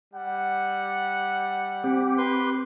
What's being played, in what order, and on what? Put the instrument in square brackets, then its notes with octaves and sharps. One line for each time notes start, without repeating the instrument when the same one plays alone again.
[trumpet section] G3 F#5
[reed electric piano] C4 [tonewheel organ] G4
[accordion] B4 C6